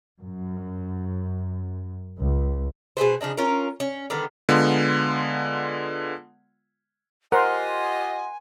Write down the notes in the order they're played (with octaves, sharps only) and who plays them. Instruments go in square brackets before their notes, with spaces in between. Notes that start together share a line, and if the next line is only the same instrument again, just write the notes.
[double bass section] F#2
C#2
[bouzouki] B2 G#4 B4 C5
C#3 F3 D4 D#4
C#4 F4 A#4
C#4
D3 D#3 G3 B3
[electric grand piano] D3 G#3 B3 F4
[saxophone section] F4 G4 D#5 [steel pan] A#4 C5 [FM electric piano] F#5 C6 [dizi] G#5